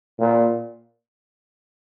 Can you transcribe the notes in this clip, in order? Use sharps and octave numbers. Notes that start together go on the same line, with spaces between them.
A#2